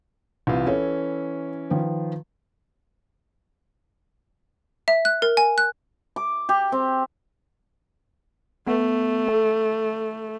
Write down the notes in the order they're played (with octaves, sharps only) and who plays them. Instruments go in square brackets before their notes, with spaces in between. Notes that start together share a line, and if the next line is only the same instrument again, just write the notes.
[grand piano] C2 E3 F4
[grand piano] E3 C#4 [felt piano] A4 C#5
[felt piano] D#3 F3 B4
[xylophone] E5
F#6
A#4
G#5
F#6
[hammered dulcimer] D6
G4
C4
[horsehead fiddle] A3 [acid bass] B3
[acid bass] A4